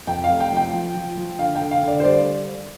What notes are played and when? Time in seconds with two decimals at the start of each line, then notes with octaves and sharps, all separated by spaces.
0.07 F2 G5
0.24 F5
0.29 F1
0.40 G5
0.51 F3 G5
0.73 F3
0.95 F3
1.17 F3
1.39 D3 F5
1.55 G5
1.61 D3
1.71 F5
1.82 D3
1.88 D5
2.00 C5
2.05 G3 D5